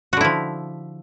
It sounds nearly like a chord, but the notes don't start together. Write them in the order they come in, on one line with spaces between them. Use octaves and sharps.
F#4 D3 E4 F3